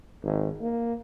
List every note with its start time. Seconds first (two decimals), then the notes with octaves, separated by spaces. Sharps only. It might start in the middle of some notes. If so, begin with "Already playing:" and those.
0.24 G#1
0.62 A#3